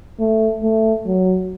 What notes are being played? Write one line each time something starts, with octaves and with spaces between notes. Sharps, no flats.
A3
A3
F#3